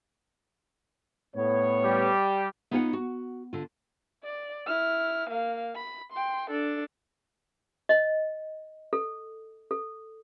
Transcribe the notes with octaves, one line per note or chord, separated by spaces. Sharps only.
A2 B3 C#5
G3 G4
B3 D#4 F4 C5 C#5 F#5
F#4
D3 F4
D5
E4 F6
A#3 F5
B5
G5 C6
D4 A4
D#5
A4
A4